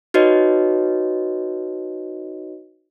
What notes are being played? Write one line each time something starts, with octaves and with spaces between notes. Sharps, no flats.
D#4 F#4 B4 C#5 D#5